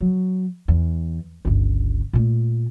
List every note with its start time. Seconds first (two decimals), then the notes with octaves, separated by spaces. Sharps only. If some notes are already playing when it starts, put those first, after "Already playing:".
0.01 F#3
0.68 E2
1.45 G1 C#2
2.13 A#2 A3